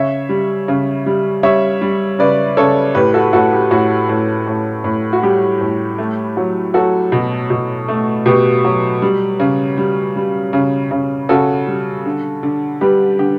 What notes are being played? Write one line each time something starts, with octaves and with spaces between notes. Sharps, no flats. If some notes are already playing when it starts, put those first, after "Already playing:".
Already playing: C#3 C#5 E5
G3
C#3
G3
G3 C#5 E5
G3
C#3 B4 D5
C#3 A4 C#5
A2 G4 B4
F#4 A4
A2 F#4 A4
G4
A2 F#4
A2
A2
A2
F#4
G3 G4
A2
A3
F#3
F#3 F#4 A4
B2
B2
A3
B2 G4 B4
F#3
G3
C#3
G3
G3
C#3
C#3
C#3 F#4 A4
G3
D3
D3
G3 G4 B4
D3 G4